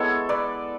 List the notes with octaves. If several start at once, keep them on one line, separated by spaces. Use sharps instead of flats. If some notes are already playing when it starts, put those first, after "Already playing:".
Already playing: G#3 B3 E4 A4 C#5
B4 D5